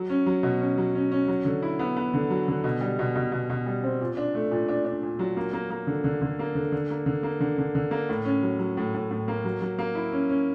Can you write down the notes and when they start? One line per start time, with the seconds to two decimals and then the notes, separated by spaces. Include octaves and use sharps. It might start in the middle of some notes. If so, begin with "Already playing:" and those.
Already playing: F#3
0.10 C#4
0.26 F#3
0.43 B2
0.60 C#4
0.78 F#3
0.95 C#4
1.12 C#4
1.28 F#3
1.45 D3
1.62 E4
1.79 B3
1.96 B3
2.14 D3
2.30 F#3
2.48 D3
2.64 B2
2.81 G3
2.99 B2
3.16 B2
3.32 B2
3.50 B2
3.66 G3
3.83 C4
4.01 A#2
4.17 D4
4.35 A3
4.51 A#2
4.68 D4
4.85 D4
5.03 A#2
5.19 F#3
5.37 A#3
5.53 A#3
5.70 A#3
5.87 D3
6.04 D3
6.22 D3
6.39 A#3
6.55 D3
6.72 D3
6.90 A#3
7.06 D3
7.23 A#3
7.40 D3
7.58 D3
7.75 D3
7.91 A#3
8.09 A2
8.25 C#4
8.43 F#3
8.59 F#3
8.77 A2
8.94 A2
9.11 A2
9.28 A#3
9.45 F#3
9.62 F#3
9.79 A#3
9.95 E4
10.12 C#4
10.29 C#4